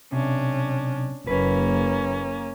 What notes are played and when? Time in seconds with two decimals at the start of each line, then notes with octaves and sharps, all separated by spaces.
0.12 B1 C3 C#4 D4
1.27 F#1 A#3 C#4 B4